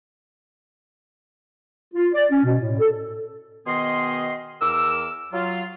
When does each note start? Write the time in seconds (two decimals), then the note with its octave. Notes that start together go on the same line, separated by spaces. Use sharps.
1.94 F4
2.14 D5
2.31 C#4
2.44 B2
2.58 A2
2.79 A4
3.67 B2 D#3 B3 G#4 D#5 C6
4.62 E2 A#4 D6 E6
5.33 F#3 F4